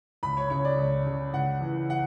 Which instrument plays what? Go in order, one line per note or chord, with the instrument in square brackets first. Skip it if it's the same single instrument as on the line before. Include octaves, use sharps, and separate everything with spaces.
[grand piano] C#2 B5
C#5
C#3 C#5
D5
C#2
C#3
C#2 F#5
E3
F#5